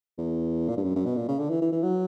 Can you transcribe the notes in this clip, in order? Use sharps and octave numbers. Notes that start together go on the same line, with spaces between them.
E2
A#2
G2
F#2
F#2
B2
A#2
C#3
D3
E3
E3
E3
F#3